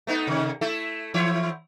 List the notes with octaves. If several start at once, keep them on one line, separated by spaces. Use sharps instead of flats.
A3 B3 D#4
C3 D#3
A3 E4 A4
E3 E4 C#5